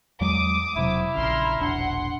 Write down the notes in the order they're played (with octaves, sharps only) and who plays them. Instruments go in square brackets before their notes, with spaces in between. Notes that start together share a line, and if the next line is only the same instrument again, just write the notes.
[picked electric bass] E2 F#3 G#3 [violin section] D6 D#6
[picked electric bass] E1 C3 F#3 [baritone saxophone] E4
[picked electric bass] A#1 C#3 [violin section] A#5 C6 F6
[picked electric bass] E1 A#1 D4 [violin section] F#5 C6